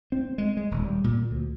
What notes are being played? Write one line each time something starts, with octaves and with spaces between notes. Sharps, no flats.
C4
G#3
G#3
D#1
G3
A#2
D2